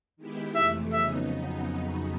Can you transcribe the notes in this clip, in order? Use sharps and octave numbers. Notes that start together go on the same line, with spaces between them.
D#3 G#3 B3 E4 G4
F2 C3 E3 A3 E5
F2 C#3 F#3 B3 D#4 E5